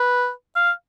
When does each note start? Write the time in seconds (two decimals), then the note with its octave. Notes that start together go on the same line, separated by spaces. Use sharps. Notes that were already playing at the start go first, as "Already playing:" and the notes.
Already playing: B4
0.56 F5